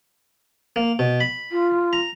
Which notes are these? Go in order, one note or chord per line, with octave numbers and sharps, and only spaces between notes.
A#3
B2
B5
F4
A#5